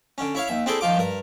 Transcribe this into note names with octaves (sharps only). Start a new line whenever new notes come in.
D3 C#4
E4 C#5 F5
D#2 E5
C4 D4 E4 G#4 A4 C5
D#3 F3 F4 D6
G2 A#4